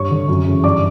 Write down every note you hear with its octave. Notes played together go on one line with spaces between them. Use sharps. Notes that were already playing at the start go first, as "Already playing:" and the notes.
Already playing: G2 C#5 C#6
D3
F#2
C#3 E3
G2 D5 D6